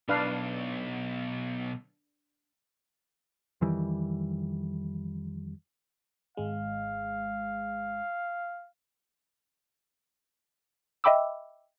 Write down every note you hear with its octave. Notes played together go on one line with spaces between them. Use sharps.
B1 D4 B4 F5
F2 D#3 E3 G3
G#1 G#3 F5
D#5 E5 G5 B5 D6 E6